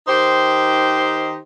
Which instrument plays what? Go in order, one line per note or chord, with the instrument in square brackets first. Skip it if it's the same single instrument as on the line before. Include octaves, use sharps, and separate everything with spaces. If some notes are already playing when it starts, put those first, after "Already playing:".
[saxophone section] D#3 D#4 G4 C5